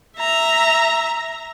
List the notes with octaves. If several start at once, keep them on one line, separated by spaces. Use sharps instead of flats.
E5 A#5